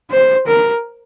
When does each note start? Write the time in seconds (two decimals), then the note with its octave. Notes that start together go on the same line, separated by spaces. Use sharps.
0.11 C5
0.47 A#4